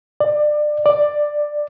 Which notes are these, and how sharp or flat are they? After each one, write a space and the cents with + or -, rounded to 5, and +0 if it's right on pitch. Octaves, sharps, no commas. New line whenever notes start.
D5 +25
D5 +10